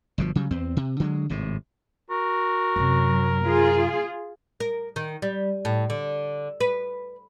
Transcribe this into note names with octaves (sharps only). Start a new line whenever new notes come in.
G1 B2 F3
C#3 F#3 G3
E2 C4
C3
D3 F#3 G#3
G#1 A2 C3
F#4 A#4
F#2 C3 F#3
F4 G#4
A#4
D#3
G3
A2
D3
B4